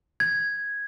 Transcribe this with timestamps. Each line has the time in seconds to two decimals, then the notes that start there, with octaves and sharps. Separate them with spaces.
0.20 G#6